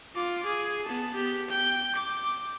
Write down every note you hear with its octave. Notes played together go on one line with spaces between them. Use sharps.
F4 D6
G#4
B3 A5
B3 G4
G5
D6